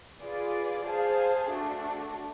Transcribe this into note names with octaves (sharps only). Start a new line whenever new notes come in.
F4 G#4 B4 D5
G#4 C5 F5 A5
A3 D4 F#4 A4